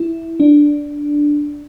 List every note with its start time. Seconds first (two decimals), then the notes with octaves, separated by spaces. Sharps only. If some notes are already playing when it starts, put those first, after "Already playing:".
Already playing: E4
0.40 D4